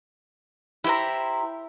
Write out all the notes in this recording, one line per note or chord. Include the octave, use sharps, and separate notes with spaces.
E4 G4 C5 A#5